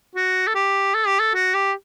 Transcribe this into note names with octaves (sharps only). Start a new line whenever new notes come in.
F#4
A4
G4
A4
G4
A4
F#4
G4